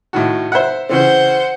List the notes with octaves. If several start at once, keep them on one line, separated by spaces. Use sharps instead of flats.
A2 D#3 F#4
C5 E5 F#5
C#3 E3 C4 C5 F#5